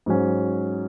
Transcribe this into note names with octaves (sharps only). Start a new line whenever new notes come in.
G#2 F#3 C#4